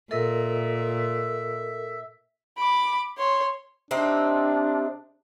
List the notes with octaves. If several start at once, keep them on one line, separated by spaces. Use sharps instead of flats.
A#2 A4 A#4 D#5 E5
B5 D6
C#5 C6
C3 C4 D4 D#4